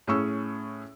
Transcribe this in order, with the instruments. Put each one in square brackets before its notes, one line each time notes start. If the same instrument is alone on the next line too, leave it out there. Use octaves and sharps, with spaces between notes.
[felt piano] A2 C#4 G#4 C#6 E6